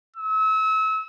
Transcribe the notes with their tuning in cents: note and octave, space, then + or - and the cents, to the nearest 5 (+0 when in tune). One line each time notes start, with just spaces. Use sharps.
E6 -35